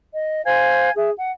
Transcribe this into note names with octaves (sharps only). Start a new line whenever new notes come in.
D#5
C5 F5 G#5 G#6
G#4 E5
F#5